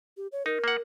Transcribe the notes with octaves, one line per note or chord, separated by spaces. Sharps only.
G4
C#5
D#4 A#4
A#3 F#5